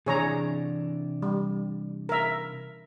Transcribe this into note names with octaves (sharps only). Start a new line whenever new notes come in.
C3 E3 D4 G#4 C#5 A#5
G3
A#4 E5